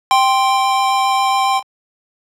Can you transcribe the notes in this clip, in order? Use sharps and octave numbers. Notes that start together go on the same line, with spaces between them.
G5 C6